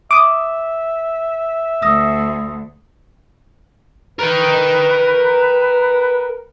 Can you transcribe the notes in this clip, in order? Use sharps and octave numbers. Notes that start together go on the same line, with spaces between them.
E5 D6 D#6
D2 D#6 E6 A#6
A#4 B4 G5